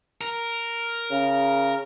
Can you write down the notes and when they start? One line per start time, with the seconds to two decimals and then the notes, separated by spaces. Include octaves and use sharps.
0.21 A#4
1.11 C#3